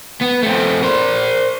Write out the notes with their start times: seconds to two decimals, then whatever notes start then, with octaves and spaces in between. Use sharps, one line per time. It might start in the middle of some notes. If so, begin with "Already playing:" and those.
0.21 B3
0.43 A3 C4
0.83 A#4 C5